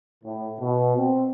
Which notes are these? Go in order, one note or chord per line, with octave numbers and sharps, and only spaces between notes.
A2
B2
C4